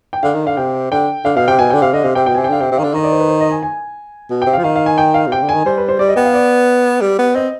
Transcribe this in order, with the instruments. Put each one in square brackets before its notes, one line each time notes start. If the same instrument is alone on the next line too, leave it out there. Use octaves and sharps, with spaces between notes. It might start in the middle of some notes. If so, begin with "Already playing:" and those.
[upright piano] G5
[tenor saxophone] D3 [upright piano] F5
[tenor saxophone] D#3
[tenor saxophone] D3 [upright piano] F5
[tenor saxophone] C3 [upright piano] G5
[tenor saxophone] D3 [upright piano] G5
[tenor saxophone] D3 [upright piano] F5
[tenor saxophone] B2 [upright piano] F5
[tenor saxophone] C3 [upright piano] G5
[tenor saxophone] B2 [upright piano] G#5
[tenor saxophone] D3 [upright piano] G5
[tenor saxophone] C3 [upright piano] F5
[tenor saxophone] D3 [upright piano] D#5
[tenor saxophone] C3 [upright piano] F5
[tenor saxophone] C3 [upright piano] G5
[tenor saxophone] B2 [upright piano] G5
[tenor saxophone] C3 [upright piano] G#5
[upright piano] G5
[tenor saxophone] D3 [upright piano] F5
[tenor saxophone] C3 [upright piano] G5
[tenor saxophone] C3
[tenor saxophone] D#3 [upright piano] F5
[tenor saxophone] D3
[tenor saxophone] D#3 [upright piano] D#5
[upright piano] D5
C5
B4
C5
D#5
G#5
G#5
[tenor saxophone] B2
[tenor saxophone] C3 [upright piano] G5
[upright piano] F5
[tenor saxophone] F3
[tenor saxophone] D#3 [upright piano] F5
[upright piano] F5
G#5
G5
F5
[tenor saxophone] B2
[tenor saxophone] C3 [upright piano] G5
[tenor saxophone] D3
[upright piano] G#5
[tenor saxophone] D#3
[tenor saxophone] G3 [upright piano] C5
[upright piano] B4
C5
[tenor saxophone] G3 [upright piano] D5
[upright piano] D#5
[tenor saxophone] B3 [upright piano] G5
[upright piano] F5
D5
[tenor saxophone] G3
B3
[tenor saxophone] C4 [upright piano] D#5